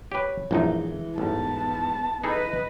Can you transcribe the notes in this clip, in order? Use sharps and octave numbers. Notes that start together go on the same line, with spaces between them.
G4 B4 C#5
A#1 F#2 E3 G#3 D#4
A1 E2 G#2 B3 A5
D#4 G#4 A4 B4 D#5 B5